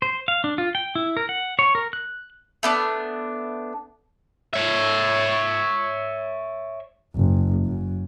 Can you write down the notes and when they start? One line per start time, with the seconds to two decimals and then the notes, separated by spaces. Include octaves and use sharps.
0.02 C5
0.28 F5
0.44 D4
0.58 F4
0.75 G5
0.95 E4
1.17 A#4
1.29 F#5
1.59 C#5
1.75 A#4
1.93 F#6
2.63 A3 B3 D4
4.53 C#5 E5
7.15 F#1
7.65 F#2